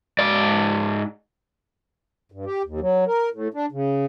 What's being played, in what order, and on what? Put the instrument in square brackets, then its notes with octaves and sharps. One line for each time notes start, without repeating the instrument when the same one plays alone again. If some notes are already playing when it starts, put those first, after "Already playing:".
[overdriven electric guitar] G#2 D5
[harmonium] G2
G4
D#2
F#3
A#4
A2
D4
C#3